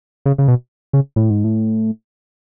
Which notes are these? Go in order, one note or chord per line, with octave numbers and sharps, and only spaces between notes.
C#3
C#3
B2
C#3
A2
G#2
A2